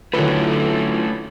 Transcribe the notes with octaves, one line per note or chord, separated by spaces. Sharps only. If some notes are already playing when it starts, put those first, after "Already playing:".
D3 F#3 A3 C#4 E4 F4 B4